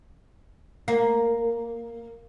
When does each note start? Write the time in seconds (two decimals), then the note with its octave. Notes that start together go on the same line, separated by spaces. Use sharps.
0.88 A#3